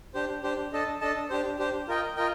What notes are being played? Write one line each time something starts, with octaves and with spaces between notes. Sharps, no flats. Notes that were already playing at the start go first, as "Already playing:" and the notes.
D4 G4 C5
D4 G4 C5
D4 A4 D#5 A5
D4 A4 D#5 A5
D4 G4 C5
D4 G4 C5
F4 A#4 D#5 G5
F4 A#4 D#5 G5